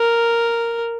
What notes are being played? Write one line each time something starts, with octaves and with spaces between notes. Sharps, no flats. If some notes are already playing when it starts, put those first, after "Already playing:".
Already playing: A#4